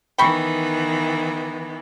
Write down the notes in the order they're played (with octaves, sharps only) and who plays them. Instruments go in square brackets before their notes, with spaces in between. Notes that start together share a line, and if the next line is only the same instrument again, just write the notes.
[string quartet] D#3 E3 B3 [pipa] G5 B5 C#6